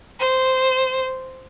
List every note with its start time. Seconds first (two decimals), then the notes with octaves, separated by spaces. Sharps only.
0.20 C5